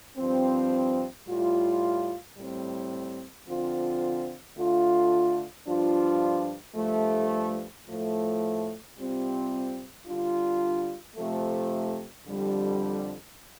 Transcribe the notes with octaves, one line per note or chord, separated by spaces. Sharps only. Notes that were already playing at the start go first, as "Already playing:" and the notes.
G2 F3 C4
A2 G3 F4
A2 G3 C4
D3 F3 C4 F4
D3 A3 F4
G2 F3 D4 F4
G2 F3 A3
A2 F3 A3
C3 G3 C4 F4
D3 G3 D4 F4
C3 F3 A3
F2 D3 G3